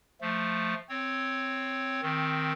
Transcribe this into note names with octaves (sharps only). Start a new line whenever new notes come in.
F3 A3
C4 C#5
D#3 C4